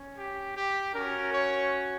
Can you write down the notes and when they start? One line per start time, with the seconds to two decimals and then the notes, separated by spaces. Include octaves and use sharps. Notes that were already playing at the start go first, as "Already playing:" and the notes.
Already playing: C#4
0.18 G4
0.56 G4
0.94 C#4 F#4 A#4
1.33 C#5